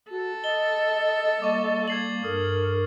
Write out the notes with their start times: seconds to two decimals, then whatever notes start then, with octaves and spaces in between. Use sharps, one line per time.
0.10 F#4 A4
0.44 D#5 G7
1.41 G3 A#3 C#6 D6 A6
1.88 G#6 C7 F#7
2.24 G2 A4 A#4 D#6